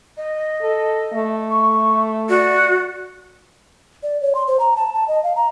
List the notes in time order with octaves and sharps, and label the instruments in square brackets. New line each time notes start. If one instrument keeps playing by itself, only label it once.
[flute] D#5
[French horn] A4
A3
[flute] C#6
[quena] F#4 [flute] D5
[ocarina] D5
C#5
C6
C5
A#5
A5
A5
D#5
F5
A#5